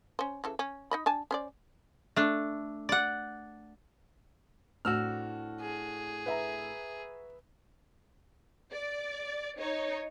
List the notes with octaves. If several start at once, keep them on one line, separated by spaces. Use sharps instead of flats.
C#4 C5
C#3 E3 A4
C#4
D#4 D#5 B5
D4 G#5 A5
C#4 C5 D5
A3 D4
D5 F#5
A2 C4 D4 F#4 E6 F6
G#4
B4 E5 A#5
D5
D#4 C#5